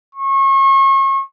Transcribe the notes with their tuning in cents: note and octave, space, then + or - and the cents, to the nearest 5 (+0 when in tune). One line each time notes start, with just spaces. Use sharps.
C#6 -35